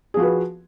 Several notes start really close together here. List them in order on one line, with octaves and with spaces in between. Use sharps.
G#4 F3 F#4 B4